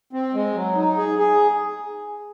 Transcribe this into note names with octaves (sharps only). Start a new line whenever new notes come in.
C4
G#3
F#3
D#4
G#4
G#4